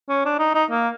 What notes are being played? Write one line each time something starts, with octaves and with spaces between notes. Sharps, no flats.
C#4
D4
D#4
D#4
A#3